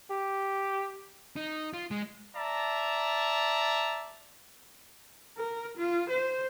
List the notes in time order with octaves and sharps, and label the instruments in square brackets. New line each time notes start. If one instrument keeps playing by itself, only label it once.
[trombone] G4
[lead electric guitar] D#4
F4
G#3
[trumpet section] D5 E5 A5 A#5
[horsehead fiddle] A#4
F4
C5